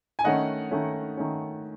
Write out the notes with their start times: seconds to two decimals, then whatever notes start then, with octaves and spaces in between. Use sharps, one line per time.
0.19 G#5
0.24 D#3 A3 C#4 D#5 F#5
0.71 D#3 A3 C#4
1.17 D#3 A3 C#4